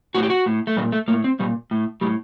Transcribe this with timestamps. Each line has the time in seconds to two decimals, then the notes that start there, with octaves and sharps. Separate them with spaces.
0.15 A2 F#4
0.23 G4
0.30 F#4
0.46 A2
0.67 A3
0.77 A#2 G3
0.92 A3
1.08 A2 A#3
1.24 C4
1.39 A#2 G3
1.71 A2
2.01 A2 G3